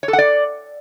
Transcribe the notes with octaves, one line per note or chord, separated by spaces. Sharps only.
C#5
A4
F#5
D5